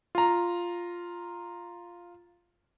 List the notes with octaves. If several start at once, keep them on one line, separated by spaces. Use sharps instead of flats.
F4 A#5